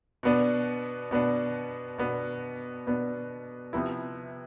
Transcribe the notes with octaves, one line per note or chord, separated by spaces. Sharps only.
B2 B3 D4
B2 B3 D4
B2 B3 D4
B2 B3 D4
C3 F3 B3 E4